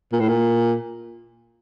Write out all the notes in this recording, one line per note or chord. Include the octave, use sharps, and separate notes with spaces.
A#2
A2
A#2